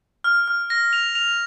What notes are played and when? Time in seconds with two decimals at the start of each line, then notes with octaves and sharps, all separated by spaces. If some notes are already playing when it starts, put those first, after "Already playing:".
0.24 F6
0.48 F6
0.70 A#6
0.93 F7
1.15 F7